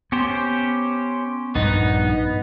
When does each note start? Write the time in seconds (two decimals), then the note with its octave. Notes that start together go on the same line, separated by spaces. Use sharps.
0.12 B3 C#4 G4 C5
1.55 A#1 G2 B3 D#4